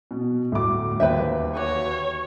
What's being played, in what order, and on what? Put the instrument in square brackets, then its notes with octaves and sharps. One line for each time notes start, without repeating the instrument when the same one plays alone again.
[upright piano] B2
[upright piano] D2 D6 [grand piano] A2
[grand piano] D#2 [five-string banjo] B4 C5 E5
[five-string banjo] F#4 B4 [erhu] C#5